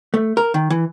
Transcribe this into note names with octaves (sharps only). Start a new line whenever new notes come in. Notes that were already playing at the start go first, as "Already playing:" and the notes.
A3
A#4
D#3
E3